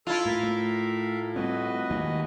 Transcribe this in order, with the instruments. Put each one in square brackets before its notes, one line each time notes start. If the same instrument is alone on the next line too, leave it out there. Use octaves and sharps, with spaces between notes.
[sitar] E4 F4 [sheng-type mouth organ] A4
[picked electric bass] A2 [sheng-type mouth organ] A#4 E5 F5
[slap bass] A3
[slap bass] G3 A3 C4 [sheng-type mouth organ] F#4 B4 D#5
[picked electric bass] D#2 [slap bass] D#3 G#3 A3